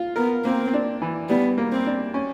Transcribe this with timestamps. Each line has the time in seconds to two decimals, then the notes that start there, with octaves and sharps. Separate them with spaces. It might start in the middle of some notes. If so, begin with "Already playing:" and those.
Already playing: F4
0.16 B3 A#4
0.45 A#3 C4
0.73 D4
1.02 E3
1.29 G3 B3
1.58 A#3
1.72 C4
1.86 D4
2.14 C#4